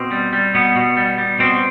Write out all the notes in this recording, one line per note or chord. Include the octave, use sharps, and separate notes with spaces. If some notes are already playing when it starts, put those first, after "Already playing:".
Already playing: B2 C4
G3
G3
B2 B3
B2
G3
G3
B2 C4